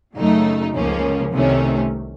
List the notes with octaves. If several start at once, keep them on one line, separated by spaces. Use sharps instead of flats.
F#2 C#3 F#3 A3 D#4
C#2 C#3 F3 A#3 C#4
C2 C3 D#3 A3 C#4